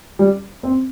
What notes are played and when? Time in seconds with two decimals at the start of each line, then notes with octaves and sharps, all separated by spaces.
0.19 G3
0.63 C4